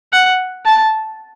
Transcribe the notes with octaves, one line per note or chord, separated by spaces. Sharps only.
F#5
A5